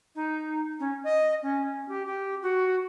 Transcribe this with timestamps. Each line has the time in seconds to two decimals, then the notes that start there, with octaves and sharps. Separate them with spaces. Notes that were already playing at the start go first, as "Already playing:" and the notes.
0.15 D#4
0.79 C#4
1.04 D#5
1.42 C#4
1.88 G4
2.06 G4
2.42 F#4